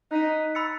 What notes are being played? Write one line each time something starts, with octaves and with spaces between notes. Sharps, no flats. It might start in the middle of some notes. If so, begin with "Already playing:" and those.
D#4 F#6 B6 D#7
B5 E6 A6 C#7